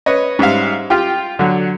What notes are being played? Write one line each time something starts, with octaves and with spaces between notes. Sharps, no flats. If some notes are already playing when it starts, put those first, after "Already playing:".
B4 C#5 D#5
G#2 G3 E5 F5
F4 G4 G5
D3 F#3